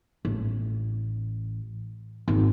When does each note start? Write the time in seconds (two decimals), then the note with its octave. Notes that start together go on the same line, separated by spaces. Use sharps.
0.25 A1
2.28 G#1